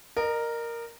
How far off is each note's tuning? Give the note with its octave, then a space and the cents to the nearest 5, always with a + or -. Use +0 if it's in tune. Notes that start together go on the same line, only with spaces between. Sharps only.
A#4 +0 D#5 -35